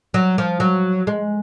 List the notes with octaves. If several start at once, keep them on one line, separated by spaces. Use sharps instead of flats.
F#3
F3
F#3
G#3